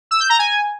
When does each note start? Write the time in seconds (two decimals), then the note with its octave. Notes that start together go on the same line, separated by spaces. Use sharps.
0.11 E6
0.20 G6
0.30 A#5
0.39 G#5